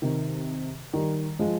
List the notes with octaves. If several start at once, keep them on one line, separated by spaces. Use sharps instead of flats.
C3 D#3
D#3 G3
F3 G#3